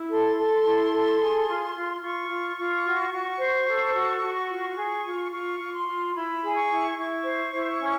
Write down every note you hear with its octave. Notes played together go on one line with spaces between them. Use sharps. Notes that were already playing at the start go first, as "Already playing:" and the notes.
Already playing: E4
A4 C6
A4
E4
A4
G#4
F4
F4
F4 C#6
F4
F4
F#4
F#4
C5
A4
F#4
F#4
F4
G#4
F4
F4 C#6
F4
C6
F4
E4 B5
G#4
C#6
E4
E4 C#6
C5
E4
C#4